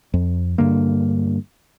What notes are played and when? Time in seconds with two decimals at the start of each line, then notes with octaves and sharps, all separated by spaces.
0.14 F2
0.58 G2 D3 A#3